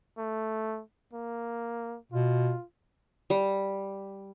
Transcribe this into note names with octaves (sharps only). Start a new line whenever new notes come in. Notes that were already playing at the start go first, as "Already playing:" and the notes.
A3
A#3
B2 F4
G3